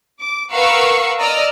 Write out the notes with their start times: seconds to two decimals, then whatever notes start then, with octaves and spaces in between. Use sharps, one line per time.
0.21 D6
0.53 A#4 B4 F5 F#5 C#6 E6
1.19 D5 D#5 A#5 E6 F6